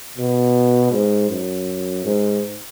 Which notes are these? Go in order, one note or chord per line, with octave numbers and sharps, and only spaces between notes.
B2
G#2
F#2
G#2